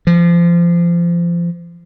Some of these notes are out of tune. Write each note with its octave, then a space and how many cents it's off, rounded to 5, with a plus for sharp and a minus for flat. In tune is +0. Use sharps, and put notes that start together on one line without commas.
F3 -25